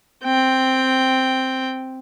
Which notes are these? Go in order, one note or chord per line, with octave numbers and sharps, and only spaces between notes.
C4 G5